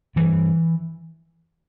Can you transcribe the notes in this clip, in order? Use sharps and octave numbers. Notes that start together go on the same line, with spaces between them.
G2 E3